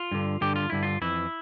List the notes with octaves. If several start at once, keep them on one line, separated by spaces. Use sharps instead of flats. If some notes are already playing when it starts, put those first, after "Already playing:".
Already playing: F4
G2 D3
G2 D3 G4
F4
G2 D3 E4
F4
F2 E3 E4